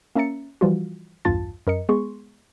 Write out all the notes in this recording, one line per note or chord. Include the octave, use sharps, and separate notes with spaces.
A#3 C#4 E5 A#5 A6 C#7
E3 F3 G3 F4 F#4
B1 E2 G2 F4 A5 A6
F#2 A#4 D#5 C#7
G#3 B3 G#4 C6 C#6